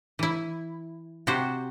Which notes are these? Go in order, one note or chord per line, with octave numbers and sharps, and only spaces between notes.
E3 E4
C3 F#4 G4 C5